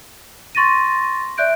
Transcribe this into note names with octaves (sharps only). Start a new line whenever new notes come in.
C6 C#6 A6 A#6 D#7
D5 E5 F#6 G6 D7